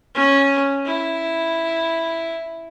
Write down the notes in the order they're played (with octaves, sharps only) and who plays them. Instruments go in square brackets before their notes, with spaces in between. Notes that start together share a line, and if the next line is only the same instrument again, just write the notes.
[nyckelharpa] C#4
E4